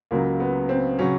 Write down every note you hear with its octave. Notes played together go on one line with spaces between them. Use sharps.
C#2 C#3 F#3 A#3
B3
C4
C#3 F#3 C#4